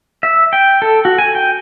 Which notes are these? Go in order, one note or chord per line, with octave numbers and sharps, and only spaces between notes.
E5
G5
A4
F#4
G#5
G5